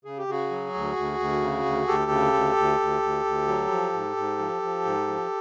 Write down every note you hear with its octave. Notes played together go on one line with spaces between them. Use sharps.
C#3 G#4
G4
C#3 F#4 G#4
F#3
D2
D2
D2
C#3
D2
D2 G4 A4
C#3
D2
D2
D2
D2
D2
F#3
F3
G#2
G#2
F3
F3
G#2
F3